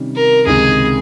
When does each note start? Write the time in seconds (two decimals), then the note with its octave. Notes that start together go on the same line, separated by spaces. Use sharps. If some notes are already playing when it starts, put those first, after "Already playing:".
Already playing: C3 D#3 G3 C#4
0.16 A#4
0.46 C#2 C3 D#3 G#3 D#4 G#4